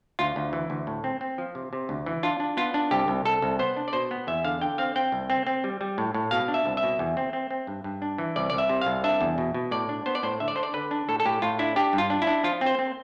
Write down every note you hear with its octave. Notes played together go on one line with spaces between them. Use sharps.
D2 F4
D2
E3
D2
A2
C4
C4
F3
C3
C3
D2
E3
D4 F4
D4
B3 F4
D4
C2 G4
C2
C2 A4
C2
B3 C5
D4
D5
B2 C5
B3
E2 E5
D3 F5
D3 G5
C4 F5
C4 G5
C2
C4
C4
G3
G3
A2
A2
B2 F5
D4
E5
C2
E5
B2
E2
C4
C4
C4
G2
G2
D4
E3
C2 D5
C2 D5
E5
C3
F5
C2
D4 E5
E2
B2
B2
A2 D5
D4
B3 C5
D5
A2 C5
D3 E5
D5
D4 C5
D5
D3 B4
D4
A2 A4
A4
A2 G4
A2 F4
D4 E4
D4 G4
G2
F4
D4
E4
D4
F3 F4
C4
C5
C4